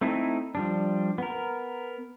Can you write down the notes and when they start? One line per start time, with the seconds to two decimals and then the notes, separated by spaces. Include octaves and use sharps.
0.01 A3 C4 D#4 E4 A4
0.55 F3 G3 D4
1.18 B3 A#4